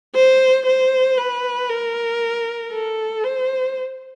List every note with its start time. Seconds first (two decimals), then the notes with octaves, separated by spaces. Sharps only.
0.15 C5
0.66 C5
1.18 B4
1.69 A#4
2.72 A4
3.24 C5